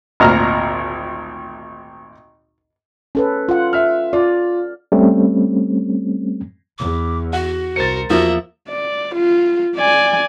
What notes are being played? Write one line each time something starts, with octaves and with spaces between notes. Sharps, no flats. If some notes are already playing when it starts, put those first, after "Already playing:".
G#1 D2 A#2 A#5 F6
C#4 A4 B4
F4 F#5
E5 F6
F4 D5
G3 A3 C4 C#4
E2 D6
F#4 F#5
C2 A#4 C5 A6 C#7
E2 F3 A#3 F#4 E5
D5
F4
D5 G#5